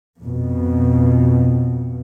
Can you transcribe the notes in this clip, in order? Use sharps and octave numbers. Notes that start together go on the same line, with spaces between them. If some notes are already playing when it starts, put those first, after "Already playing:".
F2 B2